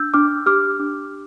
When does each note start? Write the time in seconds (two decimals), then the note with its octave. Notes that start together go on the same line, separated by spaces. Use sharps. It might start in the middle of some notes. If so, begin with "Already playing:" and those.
Already playing: D4 E6 G6
0.14 D4 D6 F6
0.46 G4 D6 F6
0.80 D4